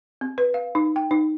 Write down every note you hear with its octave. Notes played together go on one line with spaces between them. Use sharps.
C4
B4
F5
D#4
G5
D#4